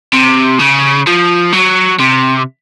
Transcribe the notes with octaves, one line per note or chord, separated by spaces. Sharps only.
C3
C#3
F3
F#3
C3